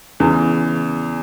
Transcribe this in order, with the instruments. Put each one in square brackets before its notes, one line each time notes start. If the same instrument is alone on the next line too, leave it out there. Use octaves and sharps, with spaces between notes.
[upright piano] E2 C#3 E3